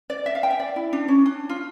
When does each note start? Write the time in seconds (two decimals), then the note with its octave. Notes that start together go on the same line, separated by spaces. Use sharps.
0.10 D5
0.26 E5
0.35 F5
0.43 G5
0.51 E5
0.60 D5
0.76 E4
0.93 D4
1.08 C#4
1.26 D4
1.49 F4